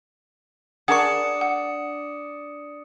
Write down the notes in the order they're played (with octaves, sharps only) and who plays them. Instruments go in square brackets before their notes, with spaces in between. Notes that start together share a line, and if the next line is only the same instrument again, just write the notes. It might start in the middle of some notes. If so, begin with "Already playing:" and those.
[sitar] D4 [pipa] G#4 A#4 C#6 [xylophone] F#5 [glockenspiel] D#6 C#7
[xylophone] F#5